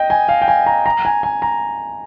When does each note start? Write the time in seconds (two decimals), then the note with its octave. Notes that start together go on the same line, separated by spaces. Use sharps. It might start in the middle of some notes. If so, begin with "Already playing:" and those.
Already playing: D#5 G5
0.10 G#5
0.29 F5
0.42 G5
0.48 G#5
0.66 A#5
0.86 A#5
1.05 G#5
1.23 G#5
1.42 A#5